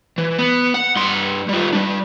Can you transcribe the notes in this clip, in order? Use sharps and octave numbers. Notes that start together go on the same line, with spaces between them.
E3
B3
F#5
G2 C6
G3 F4
G3 D4